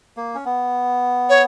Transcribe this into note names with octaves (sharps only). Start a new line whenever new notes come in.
A#3
C#4
B3
C#5